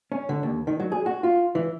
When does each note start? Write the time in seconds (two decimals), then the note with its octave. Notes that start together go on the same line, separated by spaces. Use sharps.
0.12 C#4
0.29 D3
0.43 D#2
0.67 D#3
0.80 F#3
0.92 G#4
1.06 F#4
1.23 F4
1.55 E3